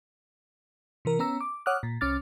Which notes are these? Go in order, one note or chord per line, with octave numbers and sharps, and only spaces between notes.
C3 E3 A#4
B3 C#4 A#5 E6
D6
C#5 F#5 D6 D#6 F6 F#6
A#2
C2 C#4 D6 F6 A6